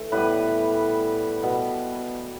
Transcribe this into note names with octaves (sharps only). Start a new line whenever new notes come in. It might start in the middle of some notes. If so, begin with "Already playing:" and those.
Already playing: E3 A3
A2 G3 B3 B4
B2 B3